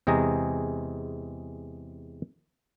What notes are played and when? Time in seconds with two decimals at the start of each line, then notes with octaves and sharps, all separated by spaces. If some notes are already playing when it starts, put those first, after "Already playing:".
0.07 E2 C3 G#3 G#4 G#5 A#5